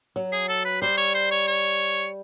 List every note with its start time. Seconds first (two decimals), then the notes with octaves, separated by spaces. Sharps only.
0.16 F#3
0.32 G#4
0.48 A4
0.65 B4
0.82 G3 C5
0.97 C#5
1.15 C5
1.31 C#5
1.47 C#5